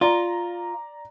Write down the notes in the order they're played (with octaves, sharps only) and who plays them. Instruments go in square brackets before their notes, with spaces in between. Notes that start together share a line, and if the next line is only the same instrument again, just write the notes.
[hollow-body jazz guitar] F4 [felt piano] D5 A#5